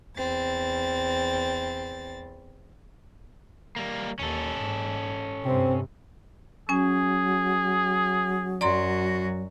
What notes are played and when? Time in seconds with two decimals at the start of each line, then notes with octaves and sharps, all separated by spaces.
0.16 E2 C4 A6
3.76 G3 A#3
4.19 D#2 C#4 A4
4.59 G#2
5.44 G2 C3 C4
6.69 F#3 C#4 G#4 G#5
8.61 F#2 F#4 D5 A#5 C6